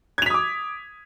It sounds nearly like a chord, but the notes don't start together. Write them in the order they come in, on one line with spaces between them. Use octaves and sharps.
G#6 F7 B6 D#6 D6